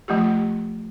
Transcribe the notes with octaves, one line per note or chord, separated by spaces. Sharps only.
F3 A3 F4 G4